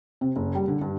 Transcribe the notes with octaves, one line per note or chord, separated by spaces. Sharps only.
C3
F#1
G3
D3
G2